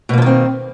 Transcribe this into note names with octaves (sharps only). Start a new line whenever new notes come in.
B2 D#3 F3 A#3 C4